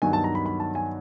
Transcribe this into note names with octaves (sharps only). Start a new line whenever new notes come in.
G2 D#3 F#3 B3 G#5
A5
A#5
B5
B5
A5
G#5